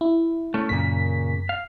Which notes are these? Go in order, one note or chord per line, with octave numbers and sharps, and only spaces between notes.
E4
A3 C#4
F#2 A#2 C#3 A#3 B6
F5